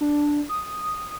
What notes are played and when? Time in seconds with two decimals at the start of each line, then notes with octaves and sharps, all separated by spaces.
0.01 D4
0.49 D#6